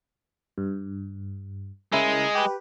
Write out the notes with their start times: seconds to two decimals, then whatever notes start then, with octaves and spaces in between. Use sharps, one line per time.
0.58 G2
1.93 C#3 G#3 E4 A#4
2.35 G4 B4